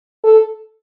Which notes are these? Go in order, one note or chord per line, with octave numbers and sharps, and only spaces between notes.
A4